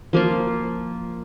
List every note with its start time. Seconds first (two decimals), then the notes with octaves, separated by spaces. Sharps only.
0.13 F3 A#3 F4